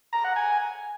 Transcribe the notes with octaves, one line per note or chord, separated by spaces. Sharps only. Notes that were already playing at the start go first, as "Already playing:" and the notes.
A#5
F#5
G#5